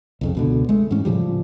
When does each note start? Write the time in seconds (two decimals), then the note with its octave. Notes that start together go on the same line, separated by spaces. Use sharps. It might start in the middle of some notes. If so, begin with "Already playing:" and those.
0.21 C2 F2 C#3
0.35 C#2 B2 D3
0.69 G#3 A3
0.91 G#2 E3 C#4
1.05 A2 C#3 F3 G3